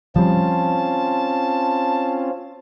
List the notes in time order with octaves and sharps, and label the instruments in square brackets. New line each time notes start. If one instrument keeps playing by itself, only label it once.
[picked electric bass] F3 G3 [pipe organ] C4 C#4 F4 [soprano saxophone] A5